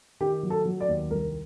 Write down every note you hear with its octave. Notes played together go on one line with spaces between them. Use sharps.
D#3 G4
F#3
A4
F#3
D5
D#2
C2 A#4